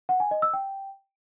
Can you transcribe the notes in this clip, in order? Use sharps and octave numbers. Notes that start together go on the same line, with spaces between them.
F#5
G#5
D#5
E6
G5